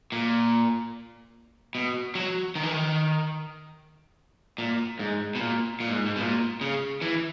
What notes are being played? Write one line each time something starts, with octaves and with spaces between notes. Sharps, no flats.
A#2
B2
F#3
D#3
E3
D#3
A#2
G#2
B2
A#2
A#2
G#2
G#2
B2
A#2
C#3
E3